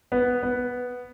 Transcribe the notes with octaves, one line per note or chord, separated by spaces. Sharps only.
B3
B3